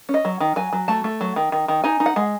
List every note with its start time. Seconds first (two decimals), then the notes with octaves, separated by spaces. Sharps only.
0.09 C#4
0.14 D#5
0.25 F#3
0.40 D#3
0.56 F#3 G#5
0.73 F#3
0.88 A3 A5
1.04 A3
1.21 F#3
1.36 D#3
1.52 D#3
1.68 D#3
1.84 D#4 G#5
2.00 D#4
2.06 F#5
2.16 G#3